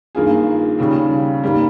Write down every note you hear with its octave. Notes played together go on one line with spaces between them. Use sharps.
G2 D#3 A#3 F4 G#4
D#2 C#3 G3
G#2 G3 A#3